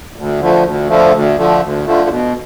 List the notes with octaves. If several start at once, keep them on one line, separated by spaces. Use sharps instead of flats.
D2
D3 F3 A3
D2
D3 F3 A3
D2
D3 F3 A3
D2
D3 F3 A3
B2